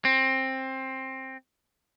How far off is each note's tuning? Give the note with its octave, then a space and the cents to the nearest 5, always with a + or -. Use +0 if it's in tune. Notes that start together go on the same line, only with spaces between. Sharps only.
C4 +15